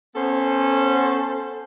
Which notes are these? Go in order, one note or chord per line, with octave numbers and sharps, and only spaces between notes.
B3 C#4 A4 C5